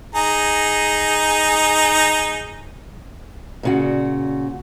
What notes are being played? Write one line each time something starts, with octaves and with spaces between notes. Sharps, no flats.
D#4 G#4 A#5
A#2 C#3 F#4